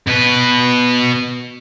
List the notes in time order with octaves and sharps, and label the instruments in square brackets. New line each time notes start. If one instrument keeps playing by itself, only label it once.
[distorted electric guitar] B2 B4